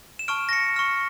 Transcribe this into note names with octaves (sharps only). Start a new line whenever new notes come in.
E7
A5 C#6 F6 D7
A#6
C#7
C#6 F6